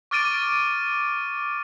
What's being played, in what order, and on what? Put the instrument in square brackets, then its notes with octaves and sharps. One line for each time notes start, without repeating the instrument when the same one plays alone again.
[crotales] C#6 D6 F6 A6 D7 D#7